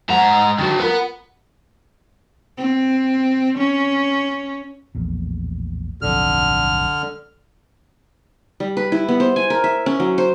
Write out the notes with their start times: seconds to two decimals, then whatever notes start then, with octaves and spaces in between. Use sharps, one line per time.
0.09 G#2 C5 F#5 A#5
0.58 D3 D#3 D4 F#4
0.79 F4 A#4 B4 F#5
2.57 C4
3.58 C#4
4.95 A#1 E2 A2
6.02 D1 B1 F2 D3 F6
8.60 G3
8.77 B4
8.92 E4
9.08 B3
9.20 C5
9.36 G#5
9.50 A#4
9.64 E5
9.86 C#4
10.00 F#3
10.18 C5